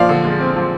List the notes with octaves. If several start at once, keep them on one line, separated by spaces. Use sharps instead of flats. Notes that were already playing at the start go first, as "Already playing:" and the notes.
Already playing: A#2 F3 D5 F5
D3
G#3
C4
F3